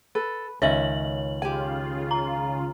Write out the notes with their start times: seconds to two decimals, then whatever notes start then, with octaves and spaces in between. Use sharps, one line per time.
0.15 A4 B4
0.62 C#2 D#3 C#4 C#5 D#5 E5 F#7
1.42 C#3 F4 G4 G#5
2.11 A#5